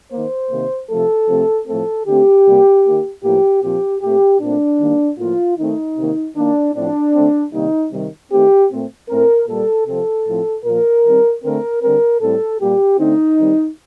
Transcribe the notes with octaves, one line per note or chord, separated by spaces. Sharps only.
D#3 A#3 C5
C3 D#3 A#3
C3 F3 A3 A4
C3 F3 A3 C4
A2 F3 A3 C4 A4
D3 A3 C4 G4
C3 G3 A#3
D#3 A#3
A2 F3 A#3 G4
A#2 F3 C4 G4
A#2 A3 C4 G4
A#2 A3 C4 D4
D#3 G3 A#3
A2 F3 A#3 F4
D#3 A3 C4 D#4
C3 D#3 A#3
D#3 A#3 D4
A2 F3 C4 D4
D3 A3 C4
C3 D#3 G3 A#3 D#4
C3 D#3 G3
D#3 A3 C4 G4
A#2 A3 C4
A2 A3 C4 A#4
A#2 G3 A#3 A4
C3 F3 C4 A4
A2 F3 C4
A#2 F3 A#3 A#4
D#3 G3 C4
D3 A3 C4 A#4
D3 G3 C4 A#4
A2 G3 C4 A4
A#2 G3 A#3 G4
D3 A3 C4 D#4
D#3 G3 C4